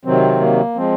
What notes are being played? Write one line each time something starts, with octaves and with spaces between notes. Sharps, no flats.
C3 D#3 F#3 C4
A#3
F3 G#3 C4